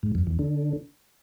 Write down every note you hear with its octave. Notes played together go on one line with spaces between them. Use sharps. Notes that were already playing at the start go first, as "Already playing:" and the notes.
G#2
F2
E2
D3